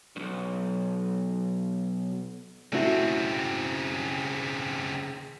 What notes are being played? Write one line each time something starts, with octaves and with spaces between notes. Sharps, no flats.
B1 G2
C#3 A3 C4 E4 F#4